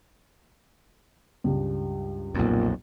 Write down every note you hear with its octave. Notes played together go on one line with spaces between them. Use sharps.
C#2 G2
B1 F2 A#2